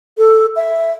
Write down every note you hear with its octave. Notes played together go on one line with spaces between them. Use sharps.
A4
E5